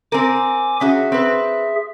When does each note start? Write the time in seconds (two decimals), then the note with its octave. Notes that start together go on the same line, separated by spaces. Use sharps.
0.12 C4 A#4 G#5 D6
0.81 C#4 F#4 G#4 E5
1.12 C4 B4